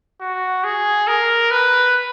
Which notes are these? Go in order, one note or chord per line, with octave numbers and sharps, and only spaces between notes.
F#4
G#4
A#4
B4